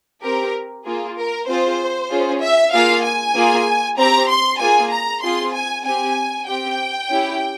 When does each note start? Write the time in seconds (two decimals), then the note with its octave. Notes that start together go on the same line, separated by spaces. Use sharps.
0.23 C4 G4 A#4
0.85 A#3 F4 G#4
1.17 A#4
1.47 C4 F4 G#4 C5
2.10 C#4 F4 G#4
2.41 E5
2.73 A#3 F4 G#4 F5
3.04 G#5
3.35 A#3 F4 G#4
3.98 C4 G4 A#5
4.28 C6
4.60 A#3 F4 G#4 G#5
4.91 A#5
5.23 C4 F4 G#4 C6
5.54 G#5
5.85 C4 G4 G#5
6.47 C4 G4 G5
7.10 C#4 E4 G4